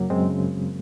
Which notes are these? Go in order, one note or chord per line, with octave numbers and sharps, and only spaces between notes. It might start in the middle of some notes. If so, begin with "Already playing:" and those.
Already playing: F#2 C#3 F#3 A#3
F#2 G#3 C4
C#3